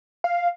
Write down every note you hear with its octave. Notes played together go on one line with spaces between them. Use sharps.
F5